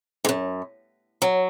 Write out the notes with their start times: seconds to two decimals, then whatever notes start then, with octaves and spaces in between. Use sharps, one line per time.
0.25 G#2
0.29 F#2
1.22 F#3